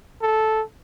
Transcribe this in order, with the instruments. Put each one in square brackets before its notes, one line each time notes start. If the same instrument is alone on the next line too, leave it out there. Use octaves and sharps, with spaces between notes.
[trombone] A4